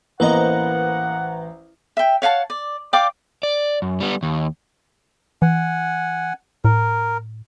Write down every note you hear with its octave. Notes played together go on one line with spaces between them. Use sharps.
A1 A#3 B3 B4 C5 D#5 F#5 A#5
E5 G5
C#5 F5 F#5 A5
D5
D5 F5 G5 D6
D5
F#2
G3 B3
D#2
E3 F#5 G#5
A2 A#4